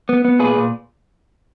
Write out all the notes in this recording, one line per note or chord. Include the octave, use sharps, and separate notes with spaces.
B3
B3
A#2 G#4 B4
A#2